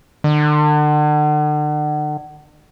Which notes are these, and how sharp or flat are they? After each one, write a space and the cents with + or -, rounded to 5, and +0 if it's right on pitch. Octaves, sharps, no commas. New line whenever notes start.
D3 +40